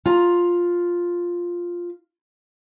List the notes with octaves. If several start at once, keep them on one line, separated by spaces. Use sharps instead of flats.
F4 A#5